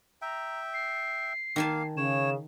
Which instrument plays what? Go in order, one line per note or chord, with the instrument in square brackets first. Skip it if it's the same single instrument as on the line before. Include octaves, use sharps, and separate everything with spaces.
[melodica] E5 G5 [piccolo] A#5
[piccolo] C7
[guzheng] D#3 G#5 A5 [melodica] A#3 F5
[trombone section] C#3 [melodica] C#5 [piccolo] E7